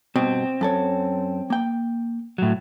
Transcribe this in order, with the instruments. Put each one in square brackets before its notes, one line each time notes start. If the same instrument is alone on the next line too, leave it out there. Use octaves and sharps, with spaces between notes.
[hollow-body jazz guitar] G2 B2 [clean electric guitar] C4
[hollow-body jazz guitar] F#2 A4 C#5
A#3 G5
[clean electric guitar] A2 F#3